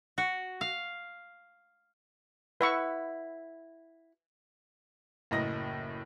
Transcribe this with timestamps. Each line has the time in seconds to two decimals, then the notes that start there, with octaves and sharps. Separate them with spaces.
0.18 F#4
0.61 F5
2.61 E4 B4 E5 F#5 C#6
5.31 F#1 A2 D#5 A#6